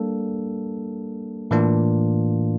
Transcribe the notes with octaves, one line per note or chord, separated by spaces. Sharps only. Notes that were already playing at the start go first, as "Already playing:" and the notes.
Already playing: G3 A#3 D4 A4
A2 E3 A#3 D4 F4